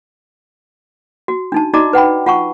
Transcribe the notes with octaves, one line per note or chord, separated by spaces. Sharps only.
F#4
D4 D#4 A5
D#4 F#4 D5 D#5 A#5 D6
B4 F#5 G5 B5
F4 F#5 A5 C#6